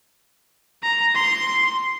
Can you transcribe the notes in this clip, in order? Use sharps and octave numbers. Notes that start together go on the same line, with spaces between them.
A#5
C6